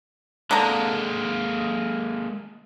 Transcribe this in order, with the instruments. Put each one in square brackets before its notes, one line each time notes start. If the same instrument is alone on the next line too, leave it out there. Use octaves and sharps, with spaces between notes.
[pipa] D3 A#5 [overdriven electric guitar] G#3 A#3